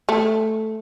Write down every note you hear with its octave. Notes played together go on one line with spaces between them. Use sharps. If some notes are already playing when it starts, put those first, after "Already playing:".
A3